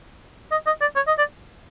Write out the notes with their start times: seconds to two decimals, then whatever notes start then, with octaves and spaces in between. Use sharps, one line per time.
0.52 D#5
0.67 D#5
0.81 D5
0.96 C#5
1.08 D#5
1.18 D5